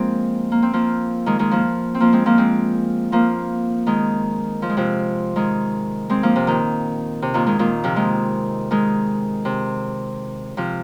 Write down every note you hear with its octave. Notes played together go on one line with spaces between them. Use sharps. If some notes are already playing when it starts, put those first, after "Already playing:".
Already playing: F3 G#3 A#3 C4
A#3
C4
F3 A#3
D#3 G#3
D#3 G#3
F3 A#3
C4
F3 A#3
G#3 C4
F3 A#3
G#3 C4
F3 A#3
D#3 G#3
F3
G#3
C3 F3
D#3 G#3
G#3 C4
F3 A#3
C3
A#2 D#3
C3
A#2 D#3
D#3 G#3
A#2 D#3
C3 F3
D#3 G#3
D#3 G#3
C3
C3 F3